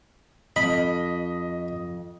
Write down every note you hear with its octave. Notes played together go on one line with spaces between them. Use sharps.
F2 D#5 B5